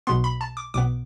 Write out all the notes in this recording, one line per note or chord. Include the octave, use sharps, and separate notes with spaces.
B1 B2 B3 C6
B5
A5
D6
B1 B2 B3 D6